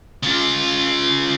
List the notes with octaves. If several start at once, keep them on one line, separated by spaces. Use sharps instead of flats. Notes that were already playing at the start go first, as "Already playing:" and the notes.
C#3 F4